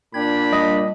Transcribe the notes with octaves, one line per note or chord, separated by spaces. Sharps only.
A#2 D4 G5 B5 G#6
G3 D#5